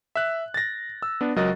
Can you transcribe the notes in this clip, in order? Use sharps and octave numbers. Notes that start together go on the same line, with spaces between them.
E5 F#6
A6 A#6
E6
B3 D4
C#2 F#3 A#4 D#5 F#6 A6